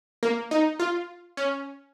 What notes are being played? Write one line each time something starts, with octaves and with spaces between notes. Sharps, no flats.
A#3
D#4
F4
C#4